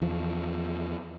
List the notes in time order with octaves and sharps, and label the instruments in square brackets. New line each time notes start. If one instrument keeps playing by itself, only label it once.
[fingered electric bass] E2 F3